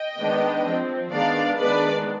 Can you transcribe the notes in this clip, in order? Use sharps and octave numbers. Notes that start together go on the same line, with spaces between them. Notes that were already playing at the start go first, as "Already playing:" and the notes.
Already playing: D#5 G5
D#3 G#3 B3 D4
F3 C4
D#3 G#3 B3 D4 D5 F5
D#3 G#3 B3 D4 B4 D5